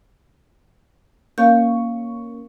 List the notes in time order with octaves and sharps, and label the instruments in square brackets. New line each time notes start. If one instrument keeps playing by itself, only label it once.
[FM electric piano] A#3 C#4 C#6 [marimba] F5 G6